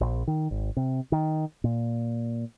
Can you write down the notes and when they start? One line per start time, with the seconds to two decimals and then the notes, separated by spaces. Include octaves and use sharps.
0.01 A#1
0.27 D#3
0.51 G#1
0.77 C3
1.12 D#3
1.64 A#2